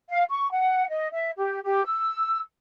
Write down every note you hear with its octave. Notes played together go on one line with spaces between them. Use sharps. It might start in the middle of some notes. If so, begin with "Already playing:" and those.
F5
C#6
F#5
D#5
E5
G4
G4
E6